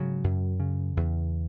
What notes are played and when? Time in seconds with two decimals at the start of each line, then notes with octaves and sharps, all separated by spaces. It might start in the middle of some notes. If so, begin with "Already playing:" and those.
Already playing: G#2 C#3 F#3
0.24 F#2
0.60 C#3
0.97 E2